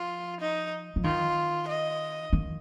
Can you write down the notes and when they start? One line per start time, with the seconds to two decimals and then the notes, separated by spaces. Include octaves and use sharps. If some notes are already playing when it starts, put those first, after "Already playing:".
Already playing: F3 F4
0.41 D#4
0.96 F3
1.04 D#3 F4
1.68 D#5
2.33 D#3